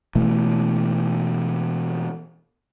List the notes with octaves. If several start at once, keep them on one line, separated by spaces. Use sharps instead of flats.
B2 E3 A3